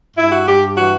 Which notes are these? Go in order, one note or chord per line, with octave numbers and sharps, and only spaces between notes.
G2 E4
F#4
G2 G4
E3 F#4